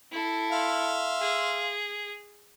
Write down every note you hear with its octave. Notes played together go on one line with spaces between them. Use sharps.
E4 A4
E5 F5 C6
G#4